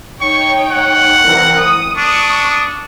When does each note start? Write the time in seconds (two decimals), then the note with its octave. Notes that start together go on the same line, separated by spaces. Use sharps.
0.21 D#4 C#5 G5 C#6
0.71 F#5
1.24 C2 E3 A#4
1.57 D#6
1.98 D4 C#6 D#6